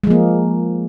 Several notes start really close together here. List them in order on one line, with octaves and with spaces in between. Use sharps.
G#3 F3 A#3